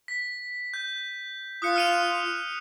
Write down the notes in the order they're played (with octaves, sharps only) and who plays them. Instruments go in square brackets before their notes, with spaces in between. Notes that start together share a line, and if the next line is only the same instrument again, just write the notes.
[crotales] B6
G6
[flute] F4 [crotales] D#6 F#6 C#7
[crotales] F6 D#7 F7